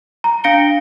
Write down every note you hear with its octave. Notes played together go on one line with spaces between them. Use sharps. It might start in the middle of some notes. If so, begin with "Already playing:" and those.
A#5
D4 F5 A#6 C#7 D7 G7